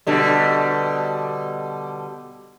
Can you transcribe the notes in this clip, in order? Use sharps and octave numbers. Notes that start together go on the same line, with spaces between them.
B2 D3 G3